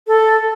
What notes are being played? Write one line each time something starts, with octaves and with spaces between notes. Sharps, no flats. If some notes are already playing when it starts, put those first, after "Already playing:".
A4